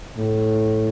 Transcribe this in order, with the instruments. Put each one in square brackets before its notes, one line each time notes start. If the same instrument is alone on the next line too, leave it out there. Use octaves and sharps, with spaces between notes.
[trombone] A2